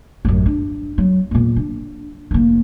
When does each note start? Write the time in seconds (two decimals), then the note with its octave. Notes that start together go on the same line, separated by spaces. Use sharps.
0.25 A1 F#2
0.46 D4
0.98 F#3
1.31 E2 A#2
1.56 D4
2.31 F1 A#3